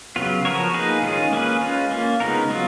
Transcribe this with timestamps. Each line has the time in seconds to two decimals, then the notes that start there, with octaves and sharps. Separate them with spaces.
0.16 C#3 F#3 B3 F4
0.45 F3 B3 F#4 A#4 C#5
0.74 A#3 D#4 G#4 B4
1.02 D#3 G#3 C#4 F4 G#4
1.33 A#3 C#4 G#4 B4
1.61 G#3 C#4 F4 B4
1.91 A#3 C#4 F4
2.20 C#3 G#3 B3 D#4 A#4
2.49 F#3 B3 F4